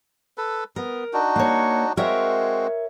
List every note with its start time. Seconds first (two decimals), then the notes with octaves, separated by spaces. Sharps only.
0.38 A4 B4
0.76 B3 A#4
1.13 D4 D#4 F#4
1.36 A#3 C#5
1.97 G#3 C4 F#4 A#4 C#5 E5